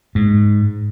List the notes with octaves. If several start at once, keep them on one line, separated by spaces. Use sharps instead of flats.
G#2